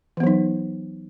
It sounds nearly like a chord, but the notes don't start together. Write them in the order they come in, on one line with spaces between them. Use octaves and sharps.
E3 B3 F#3 D#4